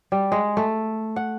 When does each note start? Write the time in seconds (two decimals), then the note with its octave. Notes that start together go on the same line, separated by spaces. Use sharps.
0.12 G3
0.32 G#3
0.57 A3
1.16 F#5